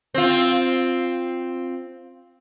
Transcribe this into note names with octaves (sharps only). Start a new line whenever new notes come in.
C4 F4